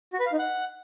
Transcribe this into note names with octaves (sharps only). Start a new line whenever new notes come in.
F#4
B4
F5
D#4
F#5